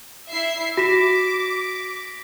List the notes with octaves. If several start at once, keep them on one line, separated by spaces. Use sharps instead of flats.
E4 E5 C7
F#4 D6 A#6 B6 E7